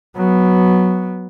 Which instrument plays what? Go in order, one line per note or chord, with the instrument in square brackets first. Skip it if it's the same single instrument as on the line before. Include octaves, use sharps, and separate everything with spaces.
[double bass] F#3 B3